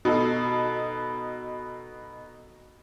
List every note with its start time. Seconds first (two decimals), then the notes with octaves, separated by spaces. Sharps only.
0.05 B2 D#4 A4